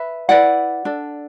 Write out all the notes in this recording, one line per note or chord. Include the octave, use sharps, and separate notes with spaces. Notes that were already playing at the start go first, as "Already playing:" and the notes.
Already playing: B4 E5
E4 B4 D5 F#5
D4 A4